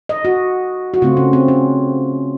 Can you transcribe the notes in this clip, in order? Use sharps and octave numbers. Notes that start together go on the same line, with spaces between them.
D#5
F#4
F#4
C#3 A3 C4 F4
C#4
C4
C#4